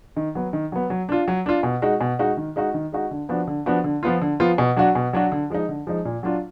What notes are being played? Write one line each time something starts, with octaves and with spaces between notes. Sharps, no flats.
D#3
F#3 B3
D#3
F#3 B3
F#3
D4 F4
F#3
D4 F4
B2
G#3 D#4 F#4
B2
G#3 D#4 F#4
D#3
G#3 D#4 F#4
D#3
G#3 D#4 F#4
D3
F3 B3 D4 F#4
D3
F3 B3 D4 F#4
D3
F3 B3 F4
D3
F3 B3 F4
B2
F#3 D4 F#4
B2
F#3 D4 F#4
D3
F3 G#3 D#4
D3
F3 G#3 D#4
A#2
F#3 D4 F4